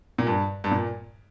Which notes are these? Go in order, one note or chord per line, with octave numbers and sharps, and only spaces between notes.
A#2
G2
G2
A#2